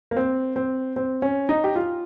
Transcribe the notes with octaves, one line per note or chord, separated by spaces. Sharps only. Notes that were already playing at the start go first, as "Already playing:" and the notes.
A#3
C4
C4
C4
C#4
D#4
G4
F4